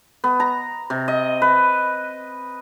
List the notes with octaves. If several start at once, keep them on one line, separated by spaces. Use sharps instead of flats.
B3
A#5
C3
D#5
B4